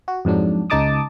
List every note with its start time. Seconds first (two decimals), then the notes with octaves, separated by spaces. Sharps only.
0.08 F#4
0.25 F2 G#2 F#3 D4
0.70 C#2 C#3 D#4 A5 D6 D#6